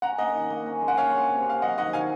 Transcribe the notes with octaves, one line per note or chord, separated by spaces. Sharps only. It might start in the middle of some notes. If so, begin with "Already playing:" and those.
C#4 F#5 A#5
A#3 D#5 F#5
D#3
A#3
C#4
G#3
F#5
F#4 C#5 F5
G#3
C3
C3 F5
F#3 D#5 F#5
D#3 D#5 F#5
D#3 F5 G#5